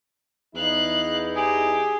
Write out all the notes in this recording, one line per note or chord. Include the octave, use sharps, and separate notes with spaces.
E2 D#4 E4 F5 F#6
G4 G#4